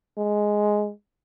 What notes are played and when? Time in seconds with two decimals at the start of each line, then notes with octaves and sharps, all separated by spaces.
0.18 G#3